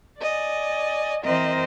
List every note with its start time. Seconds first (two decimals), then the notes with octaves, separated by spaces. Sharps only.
0.19 D5 D#5 G#5
1.25 E3 C4 A#4 C5 D#5 E5